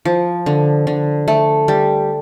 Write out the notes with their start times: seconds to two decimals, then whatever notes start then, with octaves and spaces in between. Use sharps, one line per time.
0.05 F3
0.46 D3
0.87 D3
1.28 A3
1.68 G3